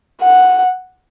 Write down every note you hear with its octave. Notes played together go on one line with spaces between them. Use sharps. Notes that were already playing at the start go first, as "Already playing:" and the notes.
F#5